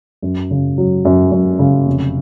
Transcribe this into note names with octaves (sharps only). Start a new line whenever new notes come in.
F#2
C#3
F#3
F#2
F#2
C#3
F1